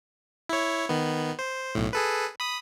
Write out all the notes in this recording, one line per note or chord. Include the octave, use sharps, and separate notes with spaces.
E4 C#5
D#3 B3
C5
B1 A2
G#4 A4 B4
B5 D#6